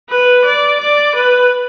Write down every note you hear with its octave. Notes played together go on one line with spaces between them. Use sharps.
B4
D5
D5
B4